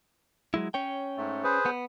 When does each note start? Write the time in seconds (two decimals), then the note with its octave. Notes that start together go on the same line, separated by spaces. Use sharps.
0.54 F#3 G#3 E4
0.74 C#4 C#5 G5
1.17 G#2 A3
1.44 G#4 B4 C5
1.66 B3